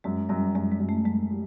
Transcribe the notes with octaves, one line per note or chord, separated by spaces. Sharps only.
F#2 G#3
F#2 G3
F#2 G#3
G#3
F#2
A3
F#2 G#3
G3